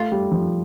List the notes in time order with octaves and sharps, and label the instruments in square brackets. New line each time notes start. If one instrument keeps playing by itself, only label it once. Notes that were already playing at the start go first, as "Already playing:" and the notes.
Already playing: [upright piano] A3 [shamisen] F4
[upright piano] G3
F3